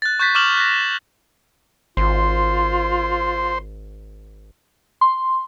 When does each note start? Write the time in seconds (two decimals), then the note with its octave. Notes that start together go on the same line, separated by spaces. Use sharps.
0.02 F#6 A6
0.20 C#6 F#6 G6 A6 B6
0.35 C#6 D6 F6 E7 F#7
0.57 F#6 A#6
1.97 G#1 F4 C5
5.01 C6